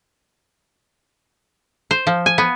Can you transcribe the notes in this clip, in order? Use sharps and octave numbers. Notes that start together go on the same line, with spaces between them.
C5
F3
G#5
B3